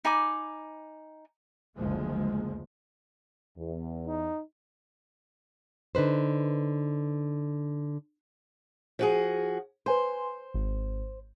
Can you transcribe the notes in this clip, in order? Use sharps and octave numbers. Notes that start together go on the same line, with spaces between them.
D#4 G#5 B5 D6
F#1 D2 F3 G#3 A#3
E2
D#4
D3 D#4 B4 C5
F3 F#4 G#4
B4 C5 G#5 C6
G#1